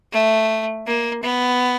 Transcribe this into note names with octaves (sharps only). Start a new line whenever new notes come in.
A3
A#3
B3